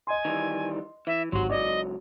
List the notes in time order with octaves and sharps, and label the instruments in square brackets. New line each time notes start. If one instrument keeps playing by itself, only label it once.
[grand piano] D#5 C6 [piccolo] G#5
[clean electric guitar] D#3 E3 G3
[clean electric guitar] E3 [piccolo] E5
[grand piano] G#1 G4 [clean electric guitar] F#3 F#4 [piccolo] C6
[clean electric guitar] C#2 F#3 [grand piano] D5 D6 [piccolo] D#5